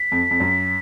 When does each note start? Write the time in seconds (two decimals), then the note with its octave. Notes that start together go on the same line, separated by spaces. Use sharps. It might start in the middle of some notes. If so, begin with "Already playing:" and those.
Already playing: B6
0.12 F2
0.31 F2
0.40 F#2